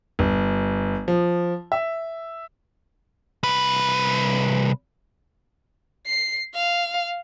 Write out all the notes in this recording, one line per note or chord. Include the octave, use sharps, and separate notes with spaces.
G1
F3
E5
C2 B4
C7
F5